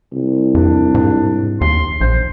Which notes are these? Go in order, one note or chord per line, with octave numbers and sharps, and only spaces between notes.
C2
F2 D4
G#2
D#2 C6
A#1 C5